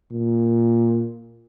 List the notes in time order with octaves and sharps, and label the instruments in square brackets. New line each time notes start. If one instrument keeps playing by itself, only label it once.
[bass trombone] A#2